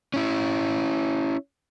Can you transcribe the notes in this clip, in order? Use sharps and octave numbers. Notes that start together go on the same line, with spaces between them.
C#4 E4